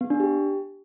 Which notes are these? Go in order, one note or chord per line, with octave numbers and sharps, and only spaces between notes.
B3
D4
G4